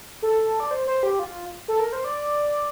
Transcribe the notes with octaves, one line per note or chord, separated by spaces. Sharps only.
A4
D5
C5
C5
G4
F4
A4
A#4
C5
D5